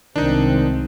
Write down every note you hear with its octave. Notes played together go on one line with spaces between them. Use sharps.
C2 D#3 G#3 C4 D4 D#4